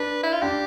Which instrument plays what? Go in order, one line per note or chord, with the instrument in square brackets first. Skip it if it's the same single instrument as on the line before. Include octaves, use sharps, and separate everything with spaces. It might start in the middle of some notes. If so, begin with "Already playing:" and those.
Already playing: [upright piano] D4 [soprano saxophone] B4
[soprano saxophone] E4
F4
[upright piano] D4 [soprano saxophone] G4